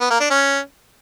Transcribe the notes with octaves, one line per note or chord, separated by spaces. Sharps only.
B3
A#3
D4
C#4